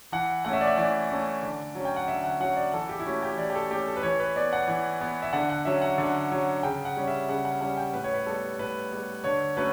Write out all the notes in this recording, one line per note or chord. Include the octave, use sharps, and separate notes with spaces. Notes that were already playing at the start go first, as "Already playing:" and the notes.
E3 F#5
A3 C#4 F#5
E5
D5
E5
E3 D5
A3 C#4
D3
F#3 C#4
G5
F#5
D3 E5
F#5
F#3 C#4 F#5
D5
E3 A4
G4
E4
A3 C#4 F#4
G4
E3 D5
G4
A4
A3 C#4 G4
A4
B4
E3 C#5
B4
B3 D5
F#5
E3
B3
E5
D3 F#5
F#5
F#3 C#4 E5
F#5
D3
F#3 C#4
C#3 G5
F#5
G3 C#4
E5
C#3 F#5
F#5
G3 C#4 F#5
G5
A2 B4
C#5
B4
G3 B3 A4
A2 B4
G3 B3
D3 C#5
F#3 A3 C#4 B4